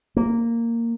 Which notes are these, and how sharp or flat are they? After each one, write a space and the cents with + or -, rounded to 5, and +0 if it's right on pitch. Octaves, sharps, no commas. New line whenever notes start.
A#3 -10